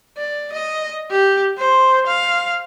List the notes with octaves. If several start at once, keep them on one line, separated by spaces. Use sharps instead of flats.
D5
D#5
G4
C5
F5